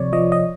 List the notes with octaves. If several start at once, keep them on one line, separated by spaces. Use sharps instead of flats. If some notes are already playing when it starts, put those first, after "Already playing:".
Already playing: C3 F3 C#5 D5
F3 D#5
D#5